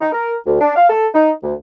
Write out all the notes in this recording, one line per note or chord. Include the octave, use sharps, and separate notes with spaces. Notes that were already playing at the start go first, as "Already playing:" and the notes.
D#4
A#4
D2
D4
F5
A4
D#4
D2